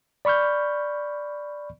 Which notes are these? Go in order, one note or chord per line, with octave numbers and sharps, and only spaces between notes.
D5 B5 C#6 F6 G6